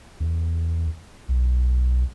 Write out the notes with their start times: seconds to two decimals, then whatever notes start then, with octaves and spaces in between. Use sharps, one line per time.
0.20 E2
1.28 B1